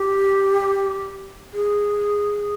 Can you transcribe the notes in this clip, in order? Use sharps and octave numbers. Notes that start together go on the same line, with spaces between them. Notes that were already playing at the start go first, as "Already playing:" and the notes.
Already playing: G4
G#4